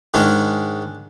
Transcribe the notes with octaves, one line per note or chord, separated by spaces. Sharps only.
G#2 D#3 G#3 C#4 D4